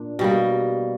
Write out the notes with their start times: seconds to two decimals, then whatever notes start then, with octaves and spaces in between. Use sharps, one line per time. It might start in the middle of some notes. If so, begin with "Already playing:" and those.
Already playing: A#2 D4
0.19 B2 G3 A#3